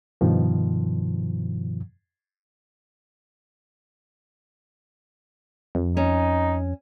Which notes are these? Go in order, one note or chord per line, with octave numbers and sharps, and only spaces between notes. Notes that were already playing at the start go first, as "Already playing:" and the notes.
G2 B2 D#3 F3
F2
C#4 D#4